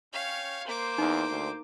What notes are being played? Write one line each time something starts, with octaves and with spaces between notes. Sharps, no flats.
C#4 C#5 F5 G5
A#3 C5 D6
E2 D#4
D2